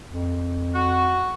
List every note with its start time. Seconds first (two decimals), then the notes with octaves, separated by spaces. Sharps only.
0.09 F2
0.75 F#4